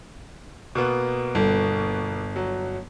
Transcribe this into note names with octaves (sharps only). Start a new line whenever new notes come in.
B2 A#3 B3
G1
F#3